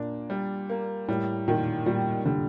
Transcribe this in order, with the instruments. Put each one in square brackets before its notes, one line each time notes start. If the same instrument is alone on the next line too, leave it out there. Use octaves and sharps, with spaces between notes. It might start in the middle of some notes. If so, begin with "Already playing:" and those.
Already playing: [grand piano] A#2 [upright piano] A#3 D4
[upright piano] G3
A#3
[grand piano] A2 [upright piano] G3
[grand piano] A#2 [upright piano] D#3
[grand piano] A#2 [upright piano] G3
[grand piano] D3 [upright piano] G3